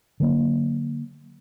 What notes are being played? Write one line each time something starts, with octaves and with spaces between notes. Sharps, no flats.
D3 F#3 A#3